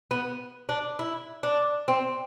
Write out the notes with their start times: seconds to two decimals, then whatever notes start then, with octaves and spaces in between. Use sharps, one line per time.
0.11 B3
0.69 D4
0.99 E4
1.43 D4
1.88 C4